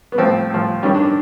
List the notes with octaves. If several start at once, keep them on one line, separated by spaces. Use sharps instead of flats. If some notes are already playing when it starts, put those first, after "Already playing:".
B3
A2 F3 C4
A2 F3
G2 D#3 G3 C#4
D4